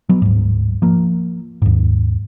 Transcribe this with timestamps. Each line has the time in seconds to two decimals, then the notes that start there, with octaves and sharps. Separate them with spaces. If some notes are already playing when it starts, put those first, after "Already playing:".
0.09 F#3 B3
0.22 D1 G#2
0.82 F3 A#3
1.62 D#2 G#2